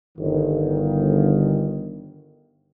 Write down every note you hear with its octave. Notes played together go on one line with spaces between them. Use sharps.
G1 D#3